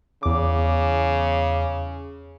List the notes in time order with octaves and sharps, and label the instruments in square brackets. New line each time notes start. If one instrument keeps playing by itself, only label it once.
[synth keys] E2 D6 [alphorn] C#3